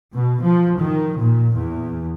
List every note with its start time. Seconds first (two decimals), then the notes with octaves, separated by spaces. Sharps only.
0.14 B2
0.44 F3
0.80 D#3
1.18 A#2
1.54 E2